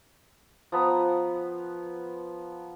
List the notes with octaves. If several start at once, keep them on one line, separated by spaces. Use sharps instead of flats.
F3 B3 A#5